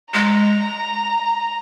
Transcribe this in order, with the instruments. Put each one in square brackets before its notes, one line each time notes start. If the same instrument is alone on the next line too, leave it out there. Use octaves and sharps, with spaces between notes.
[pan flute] G#3 [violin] A#5